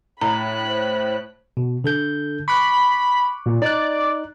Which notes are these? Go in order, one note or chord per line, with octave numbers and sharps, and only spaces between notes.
A2 A#5 B5 F#6
C5
B2
D3 A4 G6
B5 C#6 D6 F#6
A#2
D#4 D5 F#6